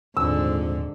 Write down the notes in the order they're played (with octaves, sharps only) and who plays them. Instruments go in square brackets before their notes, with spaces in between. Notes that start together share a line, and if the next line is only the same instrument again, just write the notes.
[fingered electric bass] D#1 [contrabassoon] F2 [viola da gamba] G#2 D3 [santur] E6